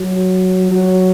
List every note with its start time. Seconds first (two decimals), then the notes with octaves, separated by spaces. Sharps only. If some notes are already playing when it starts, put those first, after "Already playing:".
Already playing: F#3
0.71 F#3